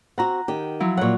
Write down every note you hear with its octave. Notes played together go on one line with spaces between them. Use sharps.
C4 F#4 F#5 A#5
D#3 G4
F3 F#3 E4
A#2 F#3 C#5 F#5